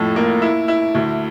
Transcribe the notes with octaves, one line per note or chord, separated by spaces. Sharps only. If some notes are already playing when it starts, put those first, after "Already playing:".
Already playing: F2 A2
A#3
E4
E4
D2